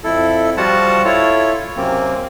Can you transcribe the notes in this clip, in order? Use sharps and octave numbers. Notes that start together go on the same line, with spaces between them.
F2 E4 A4
F3 G3 F4 F#4 F#5 A5
E4 F4 A4 C#5
F#2 C3 A#3 C4